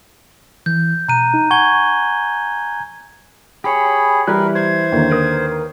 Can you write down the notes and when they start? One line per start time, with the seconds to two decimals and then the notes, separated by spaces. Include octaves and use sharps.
0.66 E3 G6
1.09 B2 A#5 F#6 D#7
1.34 D#4
1.51 F#5 G#5 C#6 G#6 G7
3.64 G4 G#4 C#5 B5
4.27 E3 G3 A#4 B4 F#6
4.55 C5 G#6
4.92 D#2 D3 A#3
5.11 A#4 B4 D#6